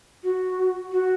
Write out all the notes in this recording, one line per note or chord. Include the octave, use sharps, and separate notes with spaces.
F#4
F#4